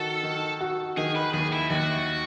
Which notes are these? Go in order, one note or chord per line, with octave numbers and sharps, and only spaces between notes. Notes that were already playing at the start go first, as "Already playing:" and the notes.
Already playing: D#3 F#4 A4
D#3
F#4
D#3 G#4
B4
D#2 G#4
E4
D#2 F#4